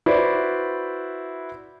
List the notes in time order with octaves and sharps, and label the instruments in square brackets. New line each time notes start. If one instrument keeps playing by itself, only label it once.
[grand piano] E4 F#4 B4 C5 D5